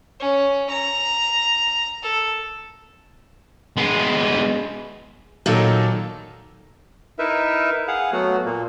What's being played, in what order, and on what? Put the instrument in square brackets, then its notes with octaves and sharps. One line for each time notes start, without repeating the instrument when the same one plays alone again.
[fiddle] C#4
A#5
A4
[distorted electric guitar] G#3 B3
[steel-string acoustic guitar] A#2 D#3 [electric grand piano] F#3 D#4 A4
[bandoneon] D#4 E4 A#4 B4 E5
G#4 F5 F#5
F#3 A3 B3 F#4
A#2 A#3